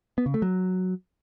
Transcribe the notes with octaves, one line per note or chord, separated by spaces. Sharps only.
B3
C#3
A3
F#3